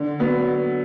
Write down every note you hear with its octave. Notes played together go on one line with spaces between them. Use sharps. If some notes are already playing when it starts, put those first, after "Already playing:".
Already playing: D3
F#3 B3